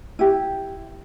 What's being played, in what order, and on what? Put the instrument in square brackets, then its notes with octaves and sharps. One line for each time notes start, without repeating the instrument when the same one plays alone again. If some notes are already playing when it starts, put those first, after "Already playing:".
[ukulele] E4 G4